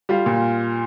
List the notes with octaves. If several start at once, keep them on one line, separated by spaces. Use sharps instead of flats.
G3 F4
A#2